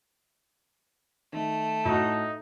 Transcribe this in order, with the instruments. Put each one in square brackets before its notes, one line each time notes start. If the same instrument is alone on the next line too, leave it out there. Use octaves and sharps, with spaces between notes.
[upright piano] D#3 [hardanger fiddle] A3
[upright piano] A2 F#4 [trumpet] D#4